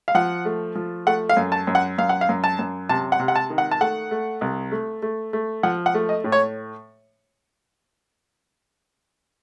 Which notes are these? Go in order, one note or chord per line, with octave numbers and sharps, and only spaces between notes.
F5
F3 F#5
A3
F3
A3 F#5
F5
F#2
A5
F#2
F#5
F#2 F5
F#5
F5
F#2
A5
F#2
C3 A5
F#5
C3
F#5
A5
D#3
F#5
A5
A3 F#5
A3
C2
A3
A3
A3
F3 F#5
F#5
A3
D#5
A2
C#5